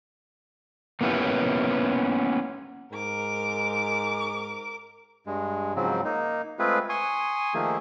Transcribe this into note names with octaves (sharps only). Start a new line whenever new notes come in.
A#3 B3 C#4 E4 G4
G#2 A#4 D6
G2 G#3
G#2 C#3 F3 F#3 C4
A#3 D#4
G#3 A3 C4 F4 G#4 B4
G#5 C6 C#6 D#6
D#3 F3 A3 A#3 G#4